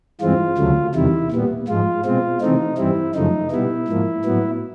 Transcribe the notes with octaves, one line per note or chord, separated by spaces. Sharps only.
G2 E3 G#3 C4 F4
D2 C#3 F#3 A3
E2 C3 D#3 G3 E4
A#2 G3 B3
G#2 F3 G#3 F4
B2 G#3 C4 F4
C3 E3 A3 C4 D#4
G2 E3 G3 C4 E4
F#2 C#3 F3 A3 D#4
B2 G3 B3 E4
G#2 F3 A#3
A2 F#3 B3